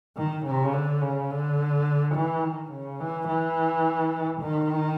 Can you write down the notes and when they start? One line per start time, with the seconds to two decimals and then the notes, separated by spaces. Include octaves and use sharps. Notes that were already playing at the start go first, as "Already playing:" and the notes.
0.17 D#3
0.46 C#3
0.73 D3
1.02 C#3
1.31 D3
2.15 E3
2.44 D#3
2.72 C#3
3.00 E3
3.28 E3
4.41 D#3